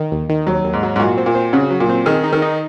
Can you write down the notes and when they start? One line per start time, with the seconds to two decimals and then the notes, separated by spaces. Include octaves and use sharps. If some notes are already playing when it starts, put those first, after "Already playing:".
Already playing: D#3
0.12 D#2
0.29 D#3
0.47 D#2 F#3
0.65 D#2
0.73 G#2
0.83 F#3
0.96 G#2
1.00 A#2 F#4
1.17 C4
1.26 A#2
1.35 C4
1.53 C#3 F#4
1.71 F#3
1.80 A#2
1.89 C4
2.06 D#3 G#4
2.24 D#4
2.33 D#3
2.42 D#4